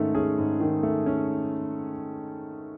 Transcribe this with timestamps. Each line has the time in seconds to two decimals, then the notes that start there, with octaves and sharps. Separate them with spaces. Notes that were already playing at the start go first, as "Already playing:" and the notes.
Already playing: G#2 D#3 A3 C#4
0.15 C#4 G#4
0.38 G#2
0.60 D#3
0.83 A3
1.06 C#4